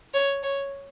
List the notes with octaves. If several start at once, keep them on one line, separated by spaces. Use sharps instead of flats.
C#5
C#5